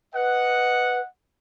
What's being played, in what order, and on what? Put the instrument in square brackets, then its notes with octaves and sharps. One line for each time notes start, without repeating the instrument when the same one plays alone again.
[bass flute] B4 [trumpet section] D#5 F#5